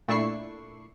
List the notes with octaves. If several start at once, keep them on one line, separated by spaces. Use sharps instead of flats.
A#2 A3 D4 E4 C#6 C7